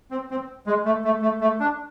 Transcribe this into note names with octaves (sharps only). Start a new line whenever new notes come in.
C4
C4
G#3
A3
A3
A3
A3
D4